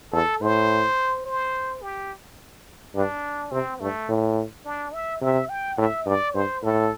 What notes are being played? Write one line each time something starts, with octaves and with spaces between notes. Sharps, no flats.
E2 A4
A2 C5
C5
G4
G2 D4
C3 C4
G2 A3
A2
D4
E5
C3 E5
G5
A2 E5
G2 D5
G2 C5
A2 A4